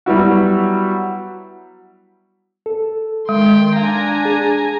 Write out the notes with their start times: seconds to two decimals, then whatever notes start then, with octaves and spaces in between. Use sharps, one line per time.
0.06 F#3 G3 B3 E4 F#4
2.66 A4
3.29 D#3 G#3 G5 C6
3.76 D4 F5 G#5 A#5
4.25 G#4